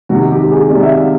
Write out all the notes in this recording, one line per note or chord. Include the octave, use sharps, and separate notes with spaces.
C3 D#3 G#3 F#4
G4
G#4
C3 D#3 G#3 D5
E5
F5